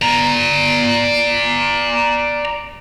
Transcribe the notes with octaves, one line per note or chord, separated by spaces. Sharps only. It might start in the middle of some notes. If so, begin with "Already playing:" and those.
D5 A#5